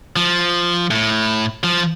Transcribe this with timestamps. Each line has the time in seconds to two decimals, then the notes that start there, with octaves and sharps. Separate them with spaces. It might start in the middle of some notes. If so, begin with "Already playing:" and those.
0.16 F3
0.91 A2
1.64 F3